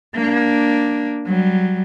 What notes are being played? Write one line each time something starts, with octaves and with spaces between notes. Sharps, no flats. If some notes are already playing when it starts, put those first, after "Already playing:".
A#3 D4
F#3 G3